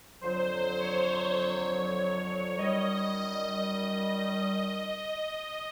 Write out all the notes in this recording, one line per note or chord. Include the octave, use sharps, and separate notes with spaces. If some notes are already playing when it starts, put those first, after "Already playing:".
F2 D3 F#3 C5
C#5
F#2 D#3 G3 D#5